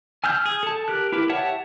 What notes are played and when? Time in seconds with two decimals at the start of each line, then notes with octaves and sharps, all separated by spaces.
0.24 G#5 E6 F6 G6
0.45 G#4
0.63 A4 A5
0.88 G4 A#4 F#6
1.12 E4 G4 A#4 B4
1.29 G4 C#5 E5 F#5 A5